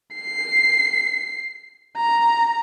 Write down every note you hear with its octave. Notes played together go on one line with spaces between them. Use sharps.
C7
A#5